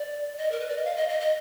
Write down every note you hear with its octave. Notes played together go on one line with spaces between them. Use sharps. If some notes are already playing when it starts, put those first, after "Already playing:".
Already playing: D5
D#5
A#4
B4
D5
D#5
F5
D#5
D#5
D#5